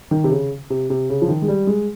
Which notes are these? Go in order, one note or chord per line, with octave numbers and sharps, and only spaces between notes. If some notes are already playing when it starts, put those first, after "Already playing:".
D#3
C3
C#3
C3
C3
C#3
F3
D#3
G#3
G3
G#3